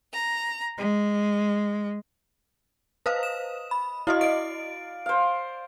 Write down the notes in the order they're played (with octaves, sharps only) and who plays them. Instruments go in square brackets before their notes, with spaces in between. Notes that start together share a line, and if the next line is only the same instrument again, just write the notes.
[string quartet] A#5
G#3
[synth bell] B4 C5 F5 [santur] D#5
[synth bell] E7
B5
[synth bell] E4 F#4 D#5 [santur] F5
[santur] D5 [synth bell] D7
[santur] C5 F5